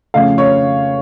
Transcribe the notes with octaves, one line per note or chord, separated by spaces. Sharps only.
F2 C#3 A3 F5
C#5